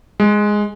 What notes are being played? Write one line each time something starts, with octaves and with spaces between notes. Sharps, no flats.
G#3